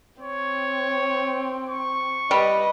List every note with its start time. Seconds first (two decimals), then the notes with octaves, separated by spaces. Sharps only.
0.22 C4 C#5
1.69 C#6
2.31 G3 B4 D#5